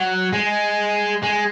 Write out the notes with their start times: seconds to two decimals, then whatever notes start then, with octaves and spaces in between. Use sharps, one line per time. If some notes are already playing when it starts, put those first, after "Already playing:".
Already playing: F#3
0.33 G#3
1.23 G#3